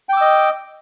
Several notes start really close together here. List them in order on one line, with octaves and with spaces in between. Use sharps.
G5 D6 E6 D#5